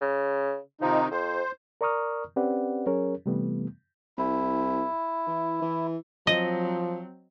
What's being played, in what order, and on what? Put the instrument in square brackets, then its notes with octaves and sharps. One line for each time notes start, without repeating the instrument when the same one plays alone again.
[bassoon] C#3
[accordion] C3 D#3 D#4 [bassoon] F3
[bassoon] F2 [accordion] C5
[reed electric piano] A#4 D5 A#5 C#6 D#6 F6
C4 C#4 G4 B4 D5 F#5
F#3 C#4 G#4 A#4 C#5
C3 E3 G3 A3 B3
[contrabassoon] C2 [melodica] E4
[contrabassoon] E3
E3
[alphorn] F3 [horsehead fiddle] F#3 C4 [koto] D#5